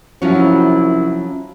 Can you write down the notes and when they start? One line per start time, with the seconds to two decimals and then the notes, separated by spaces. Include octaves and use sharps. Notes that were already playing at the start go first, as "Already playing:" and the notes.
0.22 C2 F3 F#3 C#4 E4